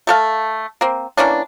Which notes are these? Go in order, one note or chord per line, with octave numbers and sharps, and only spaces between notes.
A3 A4 F5
A#3 C4
E3 A#3 C#4 D4